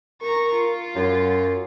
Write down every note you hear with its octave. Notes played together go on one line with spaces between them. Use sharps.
A#4 A#5 C#6
F4
F#2 F#3